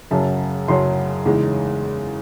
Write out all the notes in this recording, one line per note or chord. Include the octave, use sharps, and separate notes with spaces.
F#2 C#3 F#3 C#4 A5
F#2 C#3 F#3 C#4 C6
E2 C#3 G#3 D#4